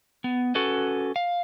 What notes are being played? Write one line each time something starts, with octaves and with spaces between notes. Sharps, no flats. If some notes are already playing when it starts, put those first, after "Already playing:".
B3
C#4 F#4 A4 B4
F5